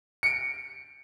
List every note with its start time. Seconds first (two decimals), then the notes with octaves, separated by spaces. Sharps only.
0.23 C#7 D7